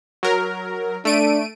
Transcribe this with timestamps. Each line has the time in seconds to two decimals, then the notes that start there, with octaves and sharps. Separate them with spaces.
0.23 F#3 A#4
1.05 A3 D4 D7 D#7